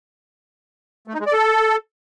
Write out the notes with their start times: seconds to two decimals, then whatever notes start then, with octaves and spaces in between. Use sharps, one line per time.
1.08 A3
1.14 D#4
1.20 G#3
1.26 D5
1.33 A4